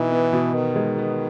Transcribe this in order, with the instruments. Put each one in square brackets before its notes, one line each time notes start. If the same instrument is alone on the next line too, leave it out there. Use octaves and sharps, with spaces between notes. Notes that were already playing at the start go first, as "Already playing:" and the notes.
Already playing: [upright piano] B2 D#4 [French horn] E3
[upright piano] B3
B2
[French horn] D#3 [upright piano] B3
[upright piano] G#3
B3